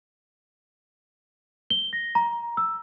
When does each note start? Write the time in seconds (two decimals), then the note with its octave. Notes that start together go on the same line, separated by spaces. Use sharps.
1.70 G7
1.93 A#6
2.15 A#5
2.57 E6